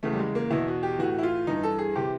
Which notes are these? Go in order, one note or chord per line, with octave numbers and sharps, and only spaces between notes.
E2 C#3 E3 A3
G3
G#3
A#3
E2 B2 E4
F#4
G4
A2 E3 F#4
E4
F4
G2 E3 D#4
A4
G#4
C3 E3 G4